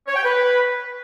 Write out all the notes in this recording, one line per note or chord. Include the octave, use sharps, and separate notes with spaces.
C#5
G5
B4